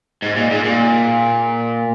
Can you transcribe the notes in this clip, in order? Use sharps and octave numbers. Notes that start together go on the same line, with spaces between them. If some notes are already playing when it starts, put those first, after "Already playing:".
G#2
A#2
G#2
A#2